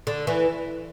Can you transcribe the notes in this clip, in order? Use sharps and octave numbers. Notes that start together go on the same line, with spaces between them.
D3
E3